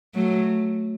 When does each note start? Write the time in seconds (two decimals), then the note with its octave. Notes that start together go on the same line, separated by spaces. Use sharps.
0.15 F#3 A3